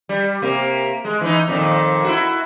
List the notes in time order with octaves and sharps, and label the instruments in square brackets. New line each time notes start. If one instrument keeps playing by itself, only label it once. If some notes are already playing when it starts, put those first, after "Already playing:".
[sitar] G3
C3 A#3
G#3
E3 D#4
F2 A#2 D#3
E4 F#4